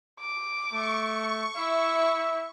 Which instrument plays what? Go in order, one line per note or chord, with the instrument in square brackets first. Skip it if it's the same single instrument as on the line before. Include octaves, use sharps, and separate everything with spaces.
[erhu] D6
[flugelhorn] A3 [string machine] C#6
[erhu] E4 [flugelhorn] E5